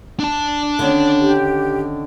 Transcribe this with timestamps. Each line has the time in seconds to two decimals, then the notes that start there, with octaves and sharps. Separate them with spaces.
0.20 D4 A5
0.79 D3 D#3 C#4
1.21 G4